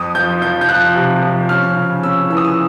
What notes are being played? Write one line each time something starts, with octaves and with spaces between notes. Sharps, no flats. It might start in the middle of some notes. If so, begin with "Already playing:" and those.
Already playing: F2 D#6
F3 G6
F3 G6
G6
F3 F#6
C3
F3
C#4 F6
C#3
C#4 E6
E3 E6
D#6
E6